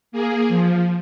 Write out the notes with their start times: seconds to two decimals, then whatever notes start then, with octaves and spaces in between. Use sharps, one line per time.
0.12 A#3 G#4
0.48 F3